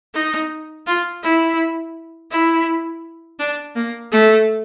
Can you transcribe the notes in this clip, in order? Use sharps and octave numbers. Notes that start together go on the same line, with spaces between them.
D#4
F4
E4
E4
D4
A#3
A3